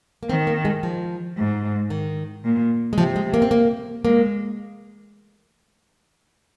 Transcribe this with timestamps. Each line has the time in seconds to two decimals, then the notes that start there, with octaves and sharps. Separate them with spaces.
0.23 A#3
0.29 D#3 C4
0.47 A#3
0.65 G#3
0.83 F3
1.37 G#2
1.90 D#3
2.44 A#2
2.93 G#3
2.98 C3 F3
3.16 G#3
3.34 A#3
3.42 C4
3.51 A#3
4.05 G#3 A#3